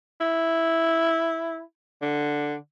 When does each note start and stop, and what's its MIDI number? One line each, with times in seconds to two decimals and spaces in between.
0.21 1.61 64
2.02 2.56 50